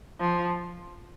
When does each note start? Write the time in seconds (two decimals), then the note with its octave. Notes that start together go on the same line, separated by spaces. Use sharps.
0.20 F3